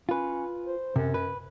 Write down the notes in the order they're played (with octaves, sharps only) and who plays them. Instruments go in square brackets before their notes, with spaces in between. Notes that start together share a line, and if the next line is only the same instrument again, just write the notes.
[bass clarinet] C#4 [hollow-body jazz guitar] F4 B4
[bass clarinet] C5
[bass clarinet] F#2 [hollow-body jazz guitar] C3
[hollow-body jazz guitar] B4